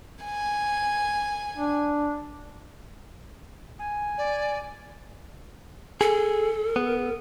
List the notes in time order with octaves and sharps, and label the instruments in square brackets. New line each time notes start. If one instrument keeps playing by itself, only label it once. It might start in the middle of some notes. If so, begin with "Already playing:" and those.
[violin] G#5
[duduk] D4
[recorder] G#5
[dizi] D5
[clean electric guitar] G#4 [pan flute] A4
[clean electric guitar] B3